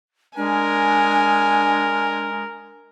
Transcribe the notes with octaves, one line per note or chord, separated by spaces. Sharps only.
G#3 D4 A#4 G#5